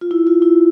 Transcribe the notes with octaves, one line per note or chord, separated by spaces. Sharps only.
F4
E4
F4
E4